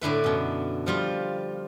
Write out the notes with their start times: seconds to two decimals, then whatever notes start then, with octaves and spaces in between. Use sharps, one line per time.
0.01 A2 D3 E4 B4
0.24 F#2 B2
0.86 F3 G3 F4